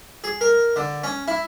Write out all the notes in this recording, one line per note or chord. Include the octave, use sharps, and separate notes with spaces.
G#4
A#4
D3
C#4
E4